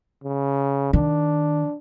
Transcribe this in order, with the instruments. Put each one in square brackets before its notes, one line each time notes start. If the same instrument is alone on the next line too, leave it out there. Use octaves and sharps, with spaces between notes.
[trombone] C#3
[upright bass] D#3 [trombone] D4